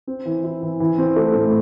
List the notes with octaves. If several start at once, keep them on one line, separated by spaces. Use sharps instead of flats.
C4
E3
E4
E3
E3
C4
A3
A2